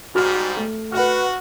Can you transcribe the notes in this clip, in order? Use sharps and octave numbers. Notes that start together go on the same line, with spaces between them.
G#2 G3 F#4 F6
A3
F#4 B4 F#5 F6